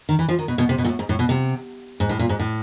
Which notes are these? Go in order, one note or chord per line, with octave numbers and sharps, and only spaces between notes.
D#3
E3
F3
D#3
B2
B2
C3
B2
A#2
A2
G#2
A2
B2
C3
G#2
A2
A#2
G#2
A2